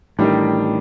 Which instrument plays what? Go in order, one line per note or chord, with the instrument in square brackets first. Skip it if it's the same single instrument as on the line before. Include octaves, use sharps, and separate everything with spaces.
[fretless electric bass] A1 A2 [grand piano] D#3 G3 D4